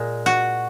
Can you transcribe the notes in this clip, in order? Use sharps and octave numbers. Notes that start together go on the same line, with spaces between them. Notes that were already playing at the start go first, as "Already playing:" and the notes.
Already playing: A#2 G#3
F#4